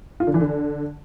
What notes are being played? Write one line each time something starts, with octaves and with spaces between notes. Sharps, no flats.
F4
D3
E3
D3